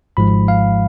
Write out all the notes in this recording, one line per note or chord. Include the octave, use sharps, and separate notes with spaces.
G#1 G#2 F3 G#3 B5
F5